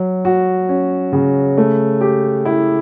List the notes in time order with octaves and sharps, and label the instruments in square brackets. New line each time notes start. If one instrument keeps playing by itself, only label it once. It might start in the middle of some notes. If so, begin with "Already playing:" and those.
Already playing: [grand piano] F#3
F#4
C#4
C#3
A3
G4
E4